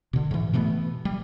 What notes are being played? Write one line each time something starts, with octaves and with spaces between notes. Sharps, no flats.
B2 D3
G#2 E3
B2 E3 A3 B3
G3